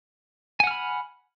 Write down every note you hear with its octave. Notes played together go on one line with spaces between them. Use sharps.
F#5 G#5 B5 F6